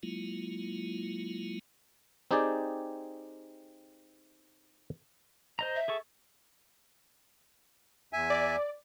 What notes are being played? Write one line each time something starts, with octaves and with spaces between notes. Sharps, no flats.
F#3 G#3 A#3 E4 F4
C4 D#4 G4 G#4 D5
C5 D#5 A#5
E5
G#4 A4 C#6
E2 E5 G#5
D5